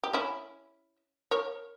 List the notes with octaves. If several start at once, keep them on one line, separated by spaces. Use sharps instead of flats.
G4
C#4 E4
A#4 C#5